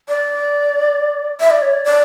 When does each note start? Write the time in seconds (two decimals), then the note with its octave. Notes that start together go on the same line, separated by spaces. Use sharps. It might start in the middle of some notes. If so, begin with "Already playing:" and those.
0.08 D5
1.40 E5
1.51 D5
1.62 C#5
1.73 D5
1.85 D5